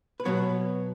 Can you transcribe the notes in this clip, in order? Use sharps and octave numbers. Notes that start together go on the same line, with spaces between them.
B4
B2 F#3 B3 C#5